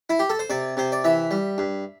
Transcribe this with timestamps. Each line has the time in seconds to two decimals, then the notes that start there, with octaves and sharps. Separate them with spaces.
0.10 E4
0.19 G4
0.30 A4
0.39 C5
0.50 C3 D5
0.77 C3 C5
0.92 D5
1.04 E3 E5
1.31 G3
1.58 G2